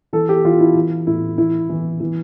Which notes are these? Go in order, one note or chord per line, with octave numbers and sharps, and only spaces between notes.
E3 A4
G4
E3 F4
E4
E3
A2 E4
E3 E4
E3
E3